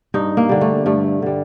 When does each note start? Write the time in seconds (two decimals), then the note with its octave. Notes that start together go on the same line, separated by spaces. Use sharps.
0.14 G2 D#4
0.37 A#3
0.49 D3 G3
0.61 A3
0.86 G2 A3
1.22 D3 G3